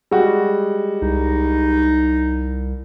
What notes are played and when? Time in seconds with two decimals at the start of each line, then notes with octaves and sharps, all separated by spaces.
0.11 G3 G#3 F#4
1.02 C2 D#4